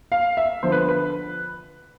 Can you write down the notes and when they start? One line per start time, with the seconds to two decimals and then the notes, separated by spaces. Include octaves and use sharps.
0.12 F5
0.37 E5
0.63 D3 F3 B3 C5
0.72 B4
0.89 B4